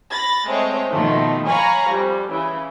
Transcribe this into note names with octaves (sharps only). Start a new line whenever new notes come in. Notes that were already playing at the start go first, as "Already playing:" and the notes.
B5 A6 A#6
G#3 A3 C4 C#5
B2 D#3 F3 A3
C#5 F5 G#5 A#5 B5 C#6
F2 G3
C#3 E3